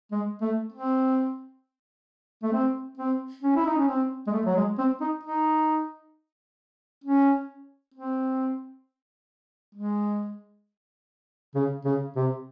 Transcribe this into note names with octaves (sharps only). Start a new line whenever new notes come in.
G#3
A3
C4
A3
C4
C4
C#4
E4
D#4
C#4
C4
G#3
A3
F#3
G#3
C4
D#4
D#4
C#4
C4
G#3
C#3
C#3
C3